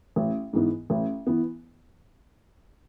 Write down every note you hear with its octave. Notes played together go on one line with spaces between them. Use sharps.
A1
G#2 E3 B3
A1
E3 B3